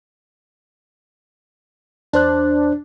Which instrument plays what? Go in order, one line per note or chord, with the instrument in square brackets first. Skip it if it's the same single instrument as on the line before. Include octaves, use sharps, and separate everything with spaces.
[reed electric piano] E2 C5 F#6 [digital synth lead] D4